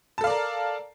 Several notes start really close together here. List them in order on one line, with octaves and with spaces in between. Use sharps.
A5 A4 F5 D5 A#4